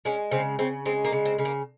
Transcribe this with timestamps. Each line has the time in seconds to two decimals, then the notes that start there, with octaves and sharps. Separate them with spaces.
0.05 G#3 C#4
0.31 C#3 C4
0.59 C#3 C4
0.86 G#3 C4
1.05 A#3
1.12 C#3
1.25 C4
1.38 C#3
1.45 A#3